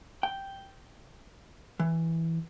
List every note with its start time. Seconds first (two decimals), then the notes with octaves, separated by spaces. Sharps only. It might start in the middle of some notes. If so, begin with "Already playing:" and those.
0.23 G5
1.80 E3